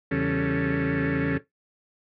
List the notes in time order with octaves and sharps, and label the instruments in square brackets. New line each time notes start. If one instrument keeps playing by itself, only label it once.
[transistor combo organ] E2 C#3 G3 C#4 A4